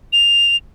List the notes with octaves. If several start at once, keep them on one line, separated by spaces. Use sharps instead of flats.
F7